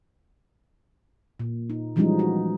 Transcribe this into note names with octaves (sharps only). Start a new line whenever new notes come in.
A#2
D#4
E3 F3 G3 G#3 C#4 D#4
F#4